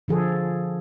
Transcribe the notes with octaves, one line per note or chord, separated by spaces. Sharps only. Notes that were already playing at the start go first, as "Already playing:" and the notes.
D3 F3 G#4 A4